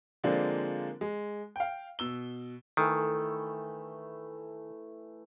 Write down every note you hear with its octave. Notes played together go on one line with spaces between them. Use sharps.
D3 F3 G#3 A#3 C4 D4
G#3
F5 G5
B2 E6 G7
D#3 E3 A3